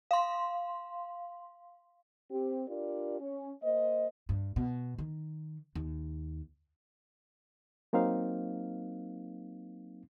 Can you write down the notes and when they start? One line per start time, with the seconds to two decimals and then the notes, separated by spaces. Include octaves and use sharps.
0.11 F5 C6
2.31 C4 G4
2.68 D4 F4 G4 A#4 D5
3.20 C#4
3.63 A#3 C5 D#5
4.29 G2
4.56 B2
4.98 D#3
5.75 D#2
7.93 F#3 A#3 C4 D#4 F5